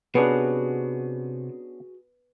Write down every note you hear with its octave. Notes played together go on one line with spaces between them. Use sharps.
C3 B3 C#4 D4 F#4 G#4 B4